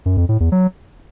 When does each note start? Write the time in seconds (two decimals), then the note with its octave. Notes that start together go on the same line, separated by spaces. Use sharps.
0.06 F#2
0.17 F2
0.29 A2
0.40 E2
0.52 F#3